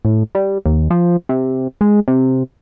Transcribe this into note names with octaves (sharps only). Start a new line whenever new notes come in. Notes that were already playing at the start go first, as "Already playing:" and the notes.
A2
G3
D#2
F3
C3
G#3
C3